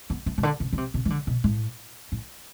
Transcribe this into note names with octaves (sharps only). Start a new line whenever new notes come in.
B3
A3
C3
D3
C3
D3
C3
C3
E3
D3
B2
A2
A2